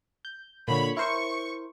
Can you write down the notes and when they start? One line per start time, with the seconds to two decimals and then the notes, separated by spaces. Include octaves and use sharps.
0.25 G6
0.68 A#2 D3 C#5 B5
0.97 E4 A#4 C5 C#6